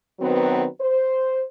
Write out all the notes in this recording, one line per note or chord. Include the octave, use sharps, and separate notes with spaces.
D#3 F#3 B3 C4 F#4 B4
C5